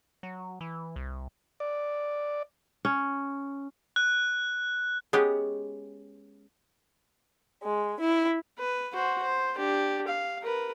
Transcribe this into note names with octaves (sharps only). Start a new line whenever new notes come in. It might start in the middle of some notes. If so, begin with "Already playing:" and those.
F#3
E3
C2
D5
C#4
F#6
G#3 B3 C#4 G4
G#3
E4
B4
F#4 C5
C5
D4 G4
F5
A#4 B4